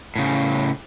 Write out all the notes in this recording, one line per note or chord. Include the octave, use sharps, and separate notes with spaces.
A2 C#3